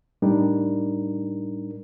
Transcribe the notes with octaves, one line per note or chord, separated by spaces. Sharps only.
A2 G3 D4 D#4 A#4